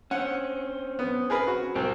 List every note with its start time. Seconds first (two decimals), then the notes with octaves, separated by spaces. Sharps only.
0.11 C4 C#4 F#5
0.99 B3
1.30 G#4 A#4 B4
1.47 F#4
1.75 C2 C4